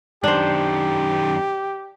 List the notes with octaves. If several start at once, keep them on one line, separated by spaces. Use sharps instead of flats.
F#2 D#3 D4 G4 C5